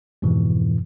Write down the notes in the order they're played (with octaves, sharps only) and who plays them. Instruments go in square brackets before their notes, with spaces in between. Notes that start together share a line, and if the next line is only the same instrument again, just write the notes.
[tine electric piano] F2 G#2 B2 E3